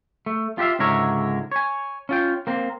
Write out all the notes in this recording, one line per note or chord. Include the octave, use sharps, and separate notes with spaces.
A3
F4 G4 B4 E5 F5
C#2 G#2 D3 A#4 C#5 E5
C#5 G#5
C#4 F4 G5
A#3 C4